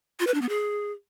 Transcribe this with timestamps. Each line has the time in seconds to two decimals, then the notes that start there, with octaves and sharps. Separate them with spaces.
0.20 F4
0.27 B4
0.34 D4
0.42 B3
0.49 G#4